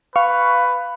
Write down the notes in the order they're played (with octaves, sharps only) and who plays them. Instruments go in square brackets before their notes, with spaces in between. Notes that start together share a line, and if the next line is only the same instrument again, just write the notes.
[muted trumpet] B4 [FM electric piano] F5 C#6